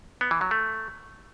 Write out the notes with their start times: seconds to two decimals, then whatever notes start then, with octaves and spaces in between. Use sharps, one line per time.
0.21 B3
0.31 E3
0.41 F#3
0.51 A3